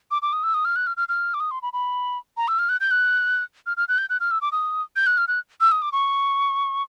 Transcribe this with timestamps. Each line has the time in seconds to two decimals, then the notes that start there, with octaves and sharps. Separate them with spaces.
0.11 D6
0.22 D6
0.33 D#6
0.43 E6
0.54 D#6
0.65 F6
0.76 F#6
0.87 F6
0.97 F6
1.09 F6
1.34 D6
1.40 D#6
1.51 C6
1.62 B5
1.73 B5
2.37 A#5
2.48 E6
2.59 F6
2.69 F#6
2.80 G6
2.91 F#6
3.66 F6
3.77 F6
3.88 F#6
3.98 G6
4.10 F#6
4.20 F6
4.31 E6
4.41 D6
4.52 D#6
4.96 G6
5.06 F#6
5.17 F6
5.28 F#6
5.61 E6
5.71 D#6
5.82 D6
5.92 C#6